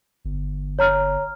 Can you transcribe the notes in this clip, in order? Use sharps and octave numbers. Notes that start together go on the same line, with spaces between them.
G1
C#5 A#5 F6